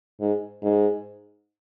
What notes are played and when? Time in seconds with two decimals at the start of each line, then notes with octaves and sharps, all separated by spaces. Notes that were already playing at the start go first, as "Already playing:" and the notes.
0.20 G#2
0.62 G#2